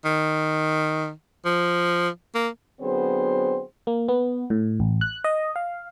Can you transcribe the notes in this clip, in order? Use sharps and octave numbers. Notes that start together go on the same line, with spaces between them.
D#3
F3
A#3
D3 F#3 B3 C4 G#4 C5
A#3
B3
A2
A1
F#6
D#5
F5